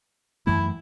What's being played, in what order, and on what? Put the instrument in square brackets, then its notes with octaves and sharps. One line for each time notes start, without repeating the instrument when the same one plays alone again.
[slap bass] F#2 E3 A3 [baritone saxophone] E4